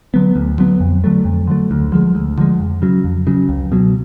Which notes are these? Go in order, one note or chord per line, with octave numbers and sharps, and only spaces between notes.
D3 F#3 B3
D2
D3 F#3 B3
F2
D3 F#3 A3
F2
D3 F#3 A3
D2
D3 F3 G#3
D2
D3 F3 G#3
F2
C#3 F#3
F2
C#3 F#3
C#2
B2 F#3